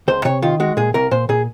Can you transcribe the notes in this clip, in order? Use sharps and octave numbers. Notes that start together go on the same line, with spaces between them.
C#2 C5
C3 C#5
D#3 F4
G#3 F#4
A#2 G#4
C2 A#4
A#2 C5
A#2 G#4